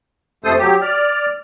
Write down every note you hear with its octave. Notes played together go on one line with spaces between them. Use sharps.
F2 C3 A3 A4 C5 D#6
F#3 G4
D5 F6